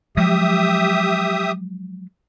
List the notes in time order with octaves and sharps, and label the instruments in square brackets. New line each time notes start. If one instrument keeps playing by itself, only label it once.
[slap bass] F3 F#3 G#3 [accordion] G4 E5 D#6